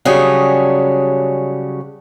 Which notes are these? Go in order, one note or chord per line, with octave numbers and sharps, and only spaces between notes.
C#3 F#3 G3 C#4 D4 G#4